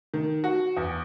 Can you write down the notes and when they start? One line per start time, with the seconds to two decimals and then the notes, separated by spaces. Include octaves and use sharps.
0.14 D#3
0.44 F#4
0.77 E2